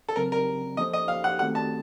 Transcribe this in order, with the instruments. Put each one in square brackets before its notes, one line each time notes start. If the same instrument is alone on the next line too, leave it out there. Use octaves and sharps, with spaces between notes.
[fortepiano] A4
[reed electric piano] C#3 F#3 C4 [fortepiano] A#4
[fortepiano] A#4
[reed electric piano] F3 A#3 C#4 A4 C5 [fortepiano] D#5
[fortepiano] D#5
F5
F#5
[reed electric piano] D#3 A3 C4 F#4 A4 [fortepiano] F#5
[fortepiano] A5